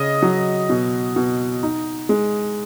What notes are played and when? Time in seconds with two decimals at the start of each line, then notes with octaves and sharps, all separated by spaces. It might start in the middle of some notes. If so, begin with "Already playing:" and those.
Already playing: C#3 D#5
0.22 F#3
0.70 B2
1.16 B2
1.63 D#4
2.09 G#3